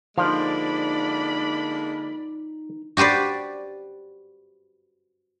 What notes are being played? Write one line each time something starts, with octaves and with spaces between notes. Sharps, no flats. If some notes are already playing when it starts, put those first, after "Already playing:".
D3 F3 G#3 A#3 D#4 D5 F5 B5
F#4 G4 B4 C5 D5